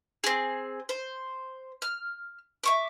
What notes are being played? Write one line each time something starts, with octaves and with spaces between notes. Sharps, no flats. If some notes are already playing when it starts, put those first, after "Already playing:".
C4 G#4
C5
F6
E5 C#6 D6